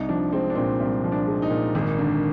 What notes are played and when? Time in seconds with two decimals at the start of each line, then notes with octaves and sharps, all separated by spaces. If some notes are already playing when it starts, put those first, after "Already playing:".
Already playing: C2 D#4
0.09 F3 D4
0.32 G#3 C4
0.50 D4
0.56 A#2 C4
0.80 C2
1.04 F3
1.12 D4
1.27 G#3
1.42 D#4
1.50 A#2
1.75 G#1
1.99 D3